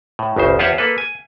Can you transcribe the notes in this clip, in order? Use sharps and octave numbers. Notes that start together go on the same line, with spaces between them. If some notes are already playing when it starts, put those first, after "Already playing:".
A2
G1 D2 C#3 C5
E2 F4 G4 C5 C#5 F#5
A#3 A4 B4
G#5